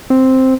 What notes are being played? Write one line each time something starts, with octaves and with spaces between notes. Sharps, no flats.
C4